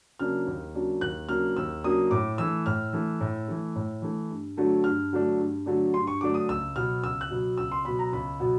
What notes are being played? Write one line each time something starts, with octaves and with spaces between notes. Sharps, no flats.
C#3 F#3 A#3 D4 F6
D#2
C#3 F#3 A#3 D4
D#2 F#6
C#3 F#3 A#3 D4 F6
D#2 E6
C#3 F#3 A#3 D4 D#6
A2 D6
E3 A3 E6
A2 F6
E3 A3
A2
E3 A3
A2
E3 A3
G2
D3 F#3 A3 D4
G2 F6
D3 F#3 A3 D4
G2
D3 F#3 A3 D4
G2 C6
C#6
D3 F#3 A3 D4 D6
D#6
C#2 E6
B2 F#3 B3 F6
C#2 E6
F#6
B2 F#3 B3
C#2 E6
C6
B2 F#3 B3 B5
A#5
C#2 B5
B2 F#3 B3